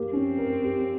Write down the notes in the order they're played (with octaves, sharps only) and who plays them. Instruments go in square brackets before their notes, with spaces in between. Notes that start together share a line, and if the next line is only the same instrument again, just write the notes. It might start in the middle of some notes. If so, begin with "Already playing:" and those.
Already playing: [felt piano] A#3 G4
[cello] C4 [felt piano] C#4
[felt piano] A#4
G4